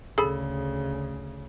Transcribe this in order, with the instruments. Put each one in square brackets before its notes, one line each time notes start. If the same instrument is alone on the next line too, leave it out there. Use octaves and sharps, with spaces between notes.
[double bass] D2 C#3 [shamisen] G#4 A4 B5